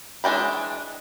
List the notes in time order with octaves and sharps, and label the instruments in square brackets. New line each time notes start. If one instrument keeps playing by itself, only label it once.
[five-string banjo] E3 G#3 D4 G5 B5